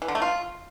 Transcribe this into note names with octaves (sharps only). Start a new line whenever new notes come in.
E3
D3
A3
F4